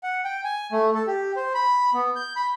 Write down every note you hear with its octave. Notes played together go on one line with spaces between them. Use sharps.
F#5
G5
G#5
A3
A4
G4
C5
B5
B3
G6
B5